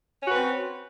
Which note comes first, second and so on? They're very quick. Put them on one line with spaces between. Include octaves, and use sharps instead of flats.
C#4 F#4 B4 C4